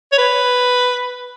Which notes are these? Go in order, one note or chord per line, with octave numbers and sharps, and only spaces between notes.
C#5
B4